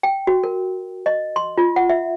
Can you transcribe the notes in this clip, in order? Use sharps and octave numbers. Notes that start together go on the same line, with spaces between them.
G5
F#4
A#4
D#5
C6
F4
F#5
E5